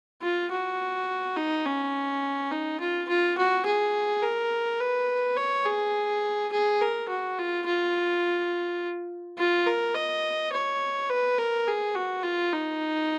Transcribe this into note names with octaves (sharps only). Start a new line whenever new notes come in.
F4
F#4
D#4
C#4
D#4
F4
F4
F#4
G#4
A#4
B4
C#5
G#4
G#4
A#4
F#4
F4
F4
F4
A#4
D#5
C#5
B4
A#4
G#4
F#4
F4
D#4